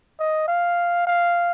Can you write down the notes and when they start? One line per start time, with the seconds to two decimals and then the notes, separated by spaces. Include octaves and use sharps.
0.19 D#5
0.48 F5
1.07 F5